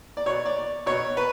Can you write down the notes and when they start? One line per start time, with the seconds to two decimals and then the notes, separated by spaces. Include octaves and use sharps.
0.17 D5
0.26 B2 C#5
0.46 D5
0.86 B2 C#5
1.17 B4